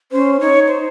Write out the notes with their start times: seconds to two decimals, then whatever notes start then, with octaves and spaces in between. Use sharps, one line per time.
0.12 C#4 C5
0.40 D#4 C#5
0.68 C5